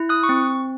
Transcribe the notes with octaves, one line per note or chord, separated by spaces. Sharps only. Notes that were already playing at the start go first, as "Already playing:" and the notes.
Already playing: E4
D#6 F#6
C#6
C4